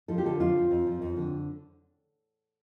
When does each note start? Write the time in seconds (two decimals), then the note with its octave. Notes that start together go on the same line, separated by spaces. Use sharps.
0.08 F3 A4
0.18 G4
0.24 D3 A4
0.40 F2 F4
0.56 F3
0.71 F2
0.87 F3
1.02 F2
1.17 D3